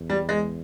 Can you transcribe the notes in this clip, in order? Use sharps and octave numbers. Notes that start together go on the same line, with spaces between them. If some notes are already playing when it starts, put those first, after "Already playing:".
Already playing: E2
G3
G#3